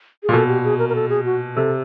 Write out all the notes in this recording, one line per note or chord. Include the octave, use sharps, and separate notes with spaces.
G#4
A#2
B2 A4
G4
G#4
A#4
A#4
A4
G#4
F#4
C3 A4